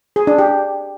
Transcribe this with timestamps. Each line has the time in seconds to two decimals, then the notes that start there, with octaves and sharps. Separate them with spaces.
0.16 G#4
0.27 D4
0.39 G4